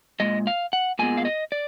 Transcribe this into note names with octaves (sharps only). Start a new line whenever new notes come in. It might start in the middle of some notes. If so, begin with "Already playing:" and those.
A#2 G#3 D#5
F5
F#5
A#2 G#3 B3 G#5
F5
D#5
D5